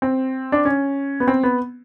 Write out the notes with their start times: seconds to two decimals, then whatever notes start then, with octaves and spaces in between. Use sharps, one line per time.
0.02 C4
0.52 D4
0.65 C#4
1.20 B3
1.28 C4
1.43 B3